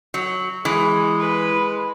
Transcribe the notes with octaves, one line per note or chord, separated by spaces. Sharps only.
F#3
E3 G#3
B4